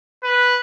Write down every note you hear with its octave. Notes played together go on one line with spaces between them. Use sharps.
B4